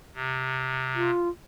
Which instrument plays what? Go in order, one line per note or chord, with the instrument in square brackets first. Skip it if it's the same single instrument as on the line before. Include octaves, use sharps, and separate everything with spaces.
[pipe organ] C3
[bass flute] F4